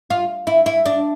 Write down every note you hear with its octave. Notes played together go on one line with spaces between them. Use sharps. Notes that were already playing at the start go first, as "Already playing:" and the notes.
F4
E4
E4
D4